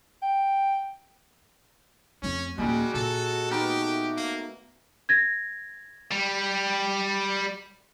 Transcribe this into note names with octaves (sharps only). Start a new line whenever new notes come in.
G5
F2 A3 C#4
D#1 G3 G#3 A#3 F#4 A#4
A#2 A4
B3 D#4 G4 A#4
A3
A#3
G#6 A#6
G3